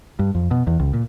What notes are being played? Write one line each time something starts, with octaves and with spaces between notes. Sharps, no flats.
G2
F2
B2
E2
C#2
A#2